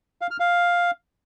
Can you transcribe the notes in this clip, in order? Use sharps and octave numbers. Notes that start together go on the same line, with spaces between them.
F5
F6
F5